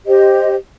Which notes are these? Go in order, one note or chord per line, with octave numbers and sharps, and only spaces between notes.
G4 C5 D#5